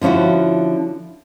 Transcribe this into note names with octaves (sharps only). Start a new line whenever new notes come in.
D3 F3 C#4 E4 F#4